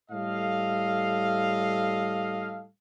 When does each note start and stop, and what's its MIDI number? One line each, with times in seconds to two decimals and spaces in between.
0.11 2.66 45
0.11 2.66 55
0.11 2.66 69
0.11 2.66 75
0.11 2.66 77